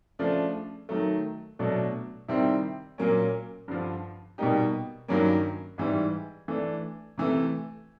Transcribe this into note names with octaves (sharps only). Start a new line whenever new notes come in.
C#3 F3 A3 D4
D#3 F#3 A3
B2 F#3 A3 D4
C3 D#3 G3 C4 E4
A#2 F#3 A#3 C#4
G2 D3 F3
B2 G3 A#3 D#4 G4
G2 D#3 F#3 A#3 C#4
G#2 E3 G3
E3 A3 D4
C3 E3 A3